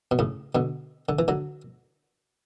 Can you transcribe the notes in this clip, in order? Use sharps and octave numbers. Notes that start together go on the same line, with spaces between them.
B2
A2 C#3
B2 D3
D3
E3
D3 F#3